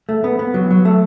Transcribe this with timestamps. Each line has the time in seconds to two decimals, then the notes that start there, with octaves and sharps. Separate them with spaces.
0.09 A3
0.24 B3
0.39 B3
0.54 F#3
0.70 F#3
0.85 A3